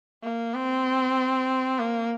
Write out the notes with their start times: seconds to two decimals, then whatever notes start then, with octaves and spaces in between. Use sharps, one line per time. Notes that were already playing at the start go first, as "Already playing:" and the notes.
0.23 A#3
0.54 C4
1.79 A#3